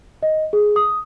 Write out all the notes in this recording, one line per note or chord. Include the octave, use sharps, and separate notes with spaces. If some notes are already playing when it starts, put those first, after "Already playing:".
D#5
G#4
D#6